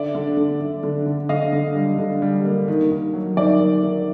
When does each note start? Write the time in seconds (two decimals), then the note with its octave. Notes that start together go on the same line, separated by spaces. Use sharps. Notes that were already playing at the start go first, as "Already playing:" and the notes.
Already playing: D3 D5 E5
0.15 D3
0.37 D3
0.61 D3
0.83 D3
1.06 D3
1.29 D3 D#5 F5
1.53 D3
1.75 G3
1.98 D3
2.22 G3
2.45 A#3
2.68 D#3
2.91 D#3
3.14 F#3
3.37 D#3 D5 E5
3.60 D#3
3.84 D#3